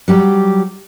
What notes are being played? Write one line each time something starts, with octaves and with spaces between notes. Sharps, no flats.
F#3 G3 G4